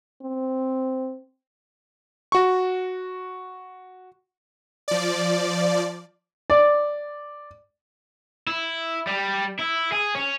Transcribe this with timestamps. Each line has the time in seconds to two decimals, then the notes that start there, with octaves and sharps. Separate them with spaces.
0.22 C4
2.32 F#4 C#6
4.88 F3 D5
6.50 D5
8.47 E4
9.07 G3
9.59 E4
9.92 G#4
10.15 C#4